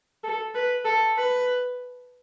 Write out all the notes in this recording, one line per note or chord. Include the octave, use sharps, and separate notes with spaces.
A4
B4
A4
B4